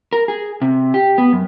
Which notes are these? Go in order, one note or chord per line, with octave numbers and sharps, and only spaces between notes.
A#4
G#4
C3
G4
B3
F#2